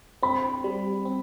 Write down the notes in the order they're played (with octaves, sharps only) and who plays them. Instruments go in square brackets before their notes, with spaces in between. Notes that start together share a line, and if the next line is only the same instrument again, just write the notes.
[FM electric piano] C4 [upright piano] B5
[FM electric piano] G3
C4